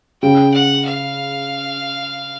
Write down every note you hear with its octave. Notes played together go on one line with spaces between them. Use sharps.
C#3 G5
F#5
F5